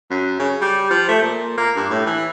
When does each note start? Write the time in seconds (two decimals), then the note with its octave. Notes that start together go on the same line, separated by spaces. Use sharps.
0.11 F#2
0.39 C#3
0.62 G3
0.91 F3
1.09 A3
1.22 A#2
1.58 A#3
1.76 G2
1.90 A2
2.07 E3